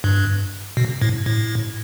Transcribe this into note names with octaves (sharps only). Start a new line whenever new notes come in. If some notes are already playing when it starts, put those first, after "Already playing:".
G2
B2
A2
A2